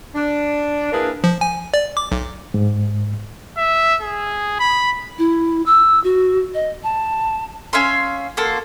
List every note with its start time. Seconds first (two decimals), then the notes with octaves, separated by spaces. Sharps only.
0.15 D4
0.93 A#3 D4 E4 G#4 A#4 B4
1.24 F3
1.41 G#5
1.74 D5
1.97 D6
2.12 B1
2.54 G#2
3.58 E5
4.02 G#4
4.60 B5
5.18 E4
5.66 E6
6.04 F#4
6.54 D#5
6.84 A5
7.73 C#4 E5 F5 C6
8.37 A#3 F#4 A4 C6